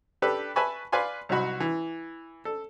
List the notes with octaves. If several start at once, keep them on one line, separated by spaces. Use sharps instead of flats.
D4 G4 A4 B4
B4 E5 G#5 A5 B5 C#6
B4 D5 F5 G#5 C6
C2 F#3 D#4 F#4 B5
E3
A4